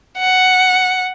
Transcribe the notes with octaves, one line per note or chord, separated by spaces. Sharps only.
F#5